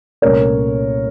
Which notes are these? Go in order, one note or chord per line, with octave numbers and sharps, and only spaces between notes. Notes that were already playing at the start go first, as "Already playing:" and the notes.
C2 A#2 A3 C#4 A#4 C#5